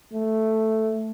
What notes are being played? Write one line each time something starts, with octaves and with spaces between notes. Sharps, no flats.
A3